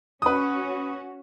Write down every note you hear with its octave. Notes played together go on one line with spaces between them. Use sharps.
C#4 F#4 B4 D#6